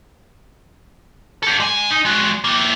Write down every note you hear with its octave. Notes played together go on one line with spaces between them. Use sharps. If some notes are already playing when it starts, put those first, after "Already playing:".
G4 A4
G#3 G#5
D#4
G#3 F#4
A#3 E4